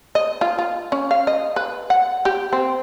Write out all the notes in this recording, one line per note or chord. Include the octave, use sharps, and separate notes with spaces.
D#5
F4
F4
C#4
F5
D#5
B4
F#5
G4
C4